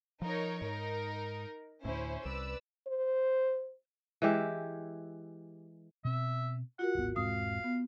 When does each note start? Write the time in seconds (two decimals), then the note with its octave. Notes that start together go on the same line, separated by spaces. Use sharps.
0.22 F3 D#4 A#4 C#5
0.61 G#2 D#4 A#4
1.85 D2 A2 C#4 E4 C5
2.25 C2 B4 D5 E6
2.87 C5
4.22 E3 G#3 G4 E5
6.05 B2 C4 E5
6.79 F4 F#4 A#4 F#5
6.95 D1 G#1 B3
7.16 E1 G#2 C4 F5 D#6
7.64 B3